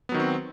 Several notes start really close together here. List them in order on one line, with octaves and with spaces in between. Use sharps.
B3 F#3 D#3 F#4 C4